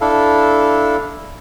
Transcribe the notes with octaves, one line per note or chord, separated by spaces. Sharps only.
D4 E4 A4 F5